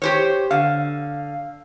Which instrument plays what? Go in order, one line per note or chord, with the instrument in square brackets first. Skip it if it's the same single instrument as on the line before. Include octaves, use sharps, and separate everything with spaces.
[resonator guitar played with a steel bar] G4 C5 C#5
[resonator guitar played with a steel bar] D3 [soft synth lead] F5